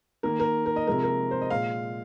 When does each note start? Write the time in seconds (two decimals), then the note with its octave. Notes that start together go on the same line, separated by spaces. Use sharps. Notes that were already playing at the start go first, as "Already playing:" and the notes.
0.23 D#3 A#3 A#4
0.40 A#4
0.66 A#4
0.76 D#5
0.87 C3 F3 G#3 A#4
1.03 A#4
1.31 C5
1.41 D#5
1.50 A#2 G#3 F5